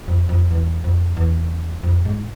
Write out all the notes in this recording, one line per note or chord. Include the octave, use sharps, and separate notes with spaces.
F2
F2
E2
F2
E2
F2
G#2